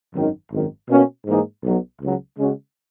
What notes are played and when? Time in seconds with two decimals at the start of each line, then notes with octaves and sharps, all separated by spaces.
0.14 G#1 F#2 D#3
0.52 G#1 F#2 D#3
0.89 B2 A#3 C#4 F#4
1.26 G#2 E3 A#3 D#4 G#4
1.64 B1 B2 F#3
2.01 C#2 C#3 F#3
2.38 C#3 G#3 C#4 F#4